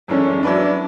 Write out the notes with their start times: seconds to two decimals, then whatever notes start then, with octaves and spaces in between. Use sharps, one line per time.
0.08 F#2 E3 G#3 C#4 D4 A4
0.42 F#3 C#4 D4 E4 B4 D5